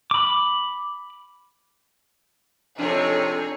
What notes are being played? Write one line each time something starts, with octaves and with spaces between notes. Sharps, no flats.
B5 D6
F2 C3 C4 D4 D#4 G#4 A4 C#5